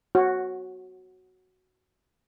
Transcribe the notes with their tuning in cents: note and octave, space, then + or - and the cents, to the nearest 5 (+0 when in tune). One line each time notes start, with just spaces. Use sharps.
F#4 +0 C#5 -25